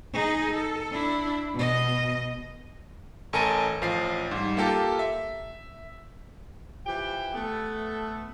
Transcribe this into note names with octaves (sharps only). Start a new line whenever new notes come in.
D#4 G#4
A4
D4 E4
B2 D#5
A1 A4 A#4 G#5 A#6 D#7
A1 F3 F5 C7
G#2 G3
A#3 F4 G4 A4
E5
E3 F3 G4 G5
A3 B3 A4